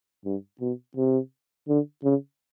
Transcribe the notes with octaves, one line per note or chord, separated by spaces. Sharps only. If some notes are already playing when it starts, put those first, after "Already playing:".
G2
B2
C3
D3
C#3